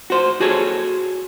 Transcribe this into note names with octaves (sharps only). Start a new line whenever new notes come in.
F#4 C5
F#4 G#4 A4 C#5